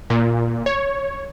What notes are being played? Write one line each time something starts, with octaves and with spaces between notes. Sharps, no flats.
A#2
C#5